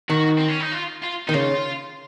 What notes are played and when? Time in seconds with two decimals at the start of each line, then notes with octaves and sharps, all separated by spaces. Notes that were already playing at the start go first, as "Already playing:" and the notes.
0.10 D#3 F#4
0.38 C4
0.49 C#4
0.60 D#4
0.72 F4
1.02 F4
1.28 D#3 D#4
1.33 C#3 F4